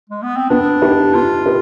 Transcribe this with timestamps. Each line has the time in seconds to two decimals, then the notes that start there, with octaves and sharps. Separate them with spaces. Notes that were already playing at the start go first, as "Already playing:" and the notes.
0.10 G#3
0.23 B3
0.37 C4
0.50 B3 D4
0.82 D#4 G4 B4
1.14 B3 F4
1.46 G4 B4